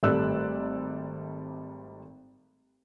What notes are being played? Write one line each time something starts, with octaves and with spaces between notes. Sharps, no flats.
G#1 G3 A3 D5 E6 F#6